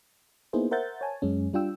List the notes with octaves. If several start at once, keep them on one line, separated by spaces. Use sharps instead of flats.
A#3 B3 D#4 E4 G#4 C5
A#4 C5 E5 F#5 G6 A6
C#5 G#5 A5
F#2 G#3 C#4
G3 D4 F4 G5 E6